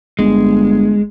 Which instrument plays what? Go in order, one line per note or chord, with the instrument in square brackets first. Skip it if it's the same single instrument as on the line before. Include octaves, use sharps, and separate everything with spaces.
[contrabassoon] G1 [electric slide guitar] G#3